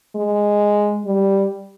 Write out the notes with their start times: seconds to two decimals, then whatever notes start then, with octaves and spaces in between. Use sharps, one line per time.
0.16 G#3
1.05 G3